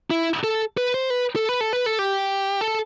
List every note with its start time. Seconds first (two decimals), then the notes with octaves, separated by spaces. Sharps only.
0.11 E4
0.44 A4
0.77 B4
0.94 C5
1.10 B4
1.36 A4
1.49 B4
1.61 A4
1.73 B4
1.86 A4
1.99 G4
2.61 A4